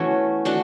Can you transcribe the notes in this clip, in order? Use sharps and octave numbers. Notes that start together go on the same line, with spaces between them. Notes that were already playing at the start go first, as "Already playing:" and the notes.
Already playing: E3 A3 B3 C#4 F#4
A3 D4 F#4